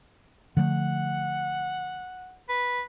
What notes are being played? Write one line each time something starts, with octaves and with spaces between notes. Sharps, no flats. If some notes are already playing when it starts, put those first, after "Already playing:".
D3 F3 A3 F#5
B4